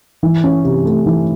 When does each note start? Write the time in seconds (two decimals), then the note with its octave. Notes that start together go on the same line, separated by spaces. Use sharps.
0.23 E3
0.44 C#4
0.64 C3
0.84 A3
1.06 E3